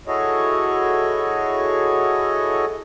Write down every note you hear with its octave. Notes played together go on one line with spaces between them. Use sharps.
E4 F#4 G#4 A4 C#5 D#5